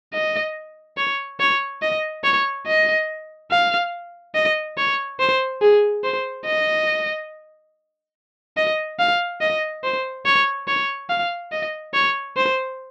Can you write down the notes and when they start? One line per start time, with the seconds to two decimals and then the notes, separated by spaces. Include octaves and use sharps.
0.13 D#5
0.97 C#5
1.40 C#5
1.82 D#5
2.24 C#5
2.67 D#5
3.51 F5
4.35 D#5
4.77 C#5
5.19 C5
5.62 G#4
6.04 C5
6.45 D#5
8.57 D#5
8.99 F5
9.41 D#5
9.84 C5
10.26 C#5
10.67 C#5
11.10 F5
11.52 D#5
11.94 C#5
12.36 C5